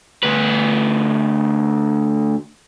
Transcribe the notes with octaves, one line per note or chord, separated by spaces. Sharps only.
D2 B4